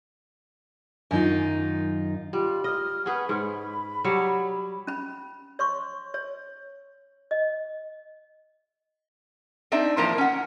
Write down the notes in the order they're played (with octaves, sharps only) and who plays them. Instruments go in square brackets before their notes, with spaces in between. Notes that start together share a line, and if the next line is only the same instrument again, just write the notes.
[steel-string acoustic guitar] F#2 D#3 D#4 F4
[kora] G3 [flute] F4
[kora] D#5 [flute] F6
[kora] C#4 G#4 B4 [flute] F#5
[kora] G#2 C#4 [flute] B5
[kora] F#3 G3 C#5
[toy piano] C#4 B5
C#5 C6 C#6
C#5
D#5
[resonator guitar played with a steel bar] C4 D4 D#4 E5
A2 E3 F3 A#3 A#4 A#5
C#4 F#5